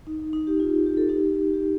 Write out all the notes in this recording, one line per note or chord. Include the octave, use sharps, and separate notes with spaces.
D#4
D#4
G4
F4
G4
A4
D#4 G4
G4